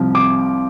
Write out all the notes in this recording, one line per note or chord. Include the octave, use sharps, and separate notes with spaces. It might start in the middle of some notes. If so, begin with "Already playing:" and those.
Already playing: C2 C3 F3 C4
D6